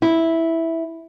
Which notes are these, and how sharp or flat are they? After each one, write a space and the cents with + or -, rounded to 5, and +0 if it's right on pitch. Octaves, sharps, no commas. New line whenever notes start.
E4 -5